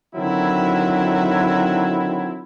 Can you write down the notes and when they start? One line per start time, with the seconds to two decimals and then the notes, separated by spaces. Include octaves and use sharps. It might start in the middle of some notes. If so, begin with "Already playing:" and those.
0.16 D3 D#3 F#3 C4 E4